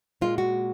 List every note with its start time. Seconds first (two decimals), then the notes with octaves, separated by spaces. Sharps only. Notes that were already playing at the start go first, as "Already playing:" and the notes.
0.21 A#2 G#3 F4
0.38 F#4